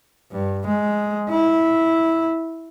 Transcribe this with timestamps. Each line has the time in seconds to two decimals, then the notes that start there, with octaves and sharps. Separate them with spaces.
0.32 G2
0.67 G#3
1.29 E4